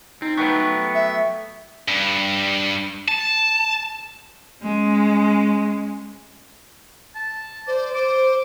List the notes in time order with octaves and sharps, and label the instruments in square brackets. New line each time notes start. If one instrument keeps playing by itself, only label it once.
[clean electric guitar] C4 [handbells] D#4
[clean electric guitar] F#3 A3 B3 [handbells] B4 G5 C#6
[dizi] E5
[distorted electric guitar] G2
A5
[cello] G#3 C#4
[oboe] A5
[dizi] C5 [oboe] D5
[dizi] C5 [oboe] D6